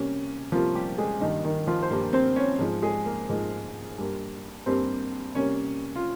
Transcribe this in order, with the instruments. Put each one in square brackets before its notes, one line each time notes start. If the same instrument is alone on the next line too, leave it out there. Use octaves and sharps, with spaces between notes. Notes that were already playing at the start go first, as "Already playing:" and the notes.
Already playing: [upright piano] C3 G3 A#3 C#4
C3 F3 G3 A#3 F4
G3 G4
G#3 G#4
G2 D#3 G3 A#3 D#4
D#3 D#4
F3 F4
C5
G2 G3 A#3 A#4
C4 C5
C#4 C#5
G#2 F3 G#3
G#3 G#4
A#3 A#4
G#2 F3 G#3
G2 G3 A#3
G2 G3 A#3 C4 C5
C3 G3 A#3 C#4 C#5
F4